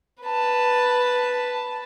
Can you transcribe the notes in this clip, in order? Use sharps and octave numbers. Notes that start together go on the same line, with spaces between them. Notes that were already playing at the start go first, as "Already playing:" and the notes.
B4 A5